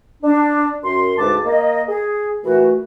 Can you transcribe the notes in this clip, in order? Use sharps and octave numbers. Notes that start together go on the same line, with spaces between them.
D4
F#2 C6
D2 G#2 B4 A5 D6
A#3 D#5
G#4
A#2 E3 A3 F#4